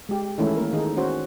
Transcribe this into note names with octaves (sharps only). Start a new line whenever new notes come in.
G#3 G4
D#3 E3 G#3 A3 C#4 E4
A#3 A#4
D#3 D#4 G#4 A4
C#4 F#4 C5